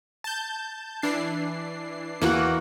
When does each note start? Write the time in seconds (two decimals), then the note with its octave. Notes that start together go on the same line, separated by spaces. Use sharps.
0.24 A5 G6
1.02 E3 D4 C7
2.22 E2 E3 A#3 F#4 F#5